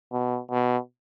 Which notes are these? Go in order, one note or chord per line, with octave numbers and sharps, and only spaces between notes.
B2
B2